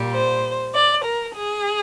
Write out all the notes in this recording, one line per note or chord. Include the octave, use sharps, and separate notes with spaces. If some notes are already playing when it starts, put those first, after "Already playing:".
Already playing: A#2 G3
C5
D5
A#4
G#4